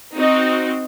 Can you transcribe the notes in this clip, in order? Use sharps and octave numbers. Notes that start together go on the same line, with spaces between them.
C4 D#4 F#4